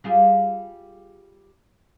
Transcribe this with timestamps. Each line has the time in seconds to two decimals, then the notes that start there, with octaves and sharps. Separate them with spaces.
0.04 G3 F4 G#4